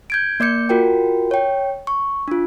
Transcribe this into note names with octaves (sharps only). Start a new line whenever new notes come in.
G6 G#6 D7
A#3 D5 D6 G6 C#7
F4 F#4 A#4 G5
C#5 G5
C#6
D4 F4